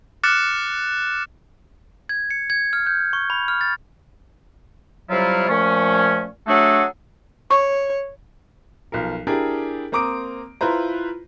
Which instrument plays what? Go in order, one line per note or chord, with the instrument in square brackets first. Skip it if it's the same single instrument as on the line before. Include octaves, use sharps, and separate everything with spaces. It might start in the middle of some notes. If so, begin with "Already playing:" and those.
[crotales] D6 F6 F#6 A6 C#7 E7
[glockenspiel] G#6
C#7
G#6
F6
G6
C#6
B5
F6
A6
[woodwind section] C3 F#3 G3 E4 F4
A#2 F3 A3 C#4
F#3 A3 D4 F#4 G#4 A4
[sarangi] C#5 [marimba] C#6
[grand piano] B1 F3 A#4
D4 E4 G4 G#4 A#4
A#3 C4 A#5 D6 D#6 D7
E4 F4 B4 C5 A#5